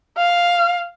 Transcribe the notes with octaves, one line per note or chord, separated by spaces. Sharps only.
F5